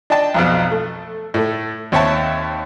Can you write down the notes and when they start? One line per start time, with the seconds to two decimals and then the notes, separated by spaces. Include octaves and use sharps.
0.10 D4 D#5 G5 A5
0.34 B1 F2 B2
0.71 A3
1.34 A2 A3
1.92 D#2 C4 C#5 E5 A5